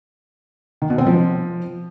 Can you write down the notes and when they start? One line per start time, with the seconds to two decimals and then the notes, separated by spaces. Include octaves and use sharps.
0.82 D#3
0.90 B2
0.98 C4
1.07 F3